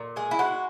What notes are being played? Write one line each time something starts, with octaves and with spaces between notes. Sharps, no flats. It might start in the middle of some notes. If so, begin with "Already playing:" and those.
Already playing: A#2
G#3 G#4
E4
G#3 F#4